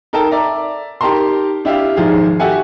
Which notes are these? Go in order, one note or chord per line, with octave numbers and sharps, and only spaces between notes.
D#4 A4 A#4 G5 A5
D5 E5 A#5
D#4 G4 A#4 A5 A#5 C6
D4 E4 G4 D#5 F5
D#1 G#2 F3 G#4
F#4 G4 A4 E5 F#5 G#5